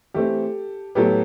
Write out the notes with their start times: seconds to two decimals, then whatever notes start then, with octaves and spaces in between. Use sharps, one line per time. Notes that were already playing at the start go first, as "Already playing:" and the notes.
0.14 E3 A3 C4 G4 A4
0.95 A2 F#3 B3 G4 A4